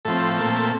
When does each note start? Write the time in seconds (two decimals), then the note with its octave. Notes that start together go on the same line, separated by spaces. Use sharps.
0.05 A2 F3 C4 A4
0.39 A#2 A3 C4